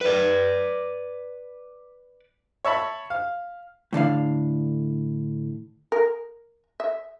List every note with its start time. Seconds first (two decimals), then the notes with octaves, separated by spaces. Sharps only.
0.01 B4 D5
2.65 C#5 E5 A5 B5
3.10 F5
3.93 A2 D3 D4 F5
5.92 A#4
6.80 E5